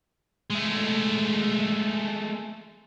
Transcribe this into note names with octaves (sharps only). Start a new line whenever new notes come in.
G#3 A3